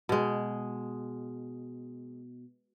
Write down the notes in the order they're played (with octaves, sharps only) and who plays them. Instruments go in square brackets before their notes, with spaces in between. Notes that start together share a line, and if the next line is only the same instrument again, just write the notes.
[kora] B2 G#3